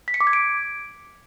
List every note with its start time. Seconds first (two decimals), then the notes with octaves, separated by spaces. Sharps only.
0.08 B6
0.14 C#7
0.21 D6
0.27 G#6
0.33 D7